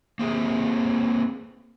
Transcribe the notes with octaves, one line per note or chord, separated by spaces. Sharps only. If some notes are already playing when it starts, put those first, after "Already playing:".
A#3 C4 G#4